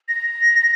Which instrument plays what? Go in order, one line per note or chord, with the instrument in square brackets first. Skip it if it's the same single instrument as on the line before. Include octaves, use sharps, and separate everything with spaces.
[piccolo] A#6